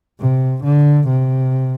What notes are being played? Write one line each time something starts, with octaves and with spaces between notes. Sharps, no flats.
C3
D3
C3